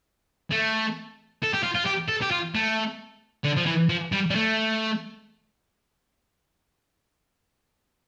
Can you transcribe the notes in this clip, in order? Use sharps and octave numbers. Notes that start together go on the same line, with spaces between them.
A3
A4
G4
F4
F4
G4
A4
G4
F4
A3
D3
F3
E3
F3
G3
G3
A3